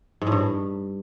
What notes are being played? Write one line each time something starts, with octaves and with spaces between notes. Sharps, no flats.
G#2
A2
G2